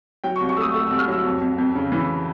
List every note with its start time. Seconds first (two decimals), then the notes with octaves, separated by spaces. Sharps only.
0.24 F#3 G5
0.36 C#6
0.41 C2
0.49 C#6
0.57 A3 D#6 E6
0.74 A3 E6
0.87 C2 E6
0.99 F6
1.08 F#3 E6
1.24 F2
1.41 F2
1.58 F2
1.75 C#3
1.92 E3